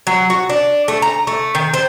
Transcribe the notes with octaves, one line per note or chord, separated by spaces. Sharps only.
F#3
F#4
D4
A3
A#5
A3
D#3
C5